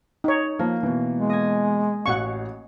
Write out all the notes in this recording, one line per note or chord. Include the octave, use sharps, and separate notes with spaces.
D#4 C#5
F3 A#3
B2 E3
G#3
D#5 G#5
A1 F#4 F5 F#5 C#6